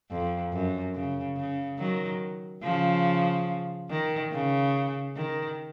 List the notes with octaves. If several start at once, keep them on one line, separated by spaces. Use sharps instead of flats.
F2
F#2
C#3
C#3
D#3 F#3
C#3 F3
D#3
C#3
D#3